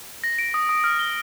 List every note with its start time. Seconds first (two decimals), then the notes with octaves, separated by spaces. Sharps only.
0.24 A#6
0.39 D7
0.54 D#6
0.69 D#6
0.84 F6
0.99 G7